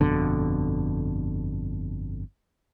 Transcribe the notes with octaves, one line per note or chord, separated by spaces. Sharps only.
G1 F2 B2 D3